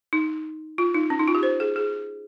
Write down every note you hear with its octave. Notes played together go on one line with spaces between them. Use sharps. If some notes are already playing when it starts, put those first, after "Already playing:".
D#4
F4
D#4
C#4
D#4
F4
G4
C5
G#4
G#4